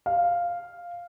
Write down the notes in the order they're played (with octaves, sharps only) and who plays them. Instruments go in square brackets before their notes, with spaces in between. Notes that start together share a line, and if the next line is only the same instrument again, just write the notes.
[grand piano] F5